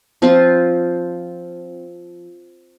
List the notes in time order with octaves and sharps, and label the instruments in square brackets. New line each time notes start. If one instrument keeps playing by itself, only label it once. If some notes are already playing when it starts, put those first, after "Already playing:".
[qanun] F3 C4 F4